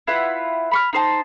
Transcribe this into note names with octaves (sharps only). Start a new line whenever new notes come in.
E4 F4 B4 F#5
B5 C#6 F6
D#4 C5 A5